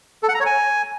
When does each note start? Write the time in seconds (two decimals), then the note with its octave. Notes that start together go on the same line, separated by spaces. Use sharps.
0.23 A4
0.29 F#5
0.34 A#5
0.40 C#5
0.46 G#5